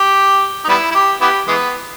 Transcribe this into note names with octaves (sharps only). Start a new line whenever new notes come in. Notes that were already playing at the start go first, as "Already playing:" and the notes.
Already playing: G4
D#4
G3 B3 E4
E4
G4
B3 E4 G4
E3 G#3 B3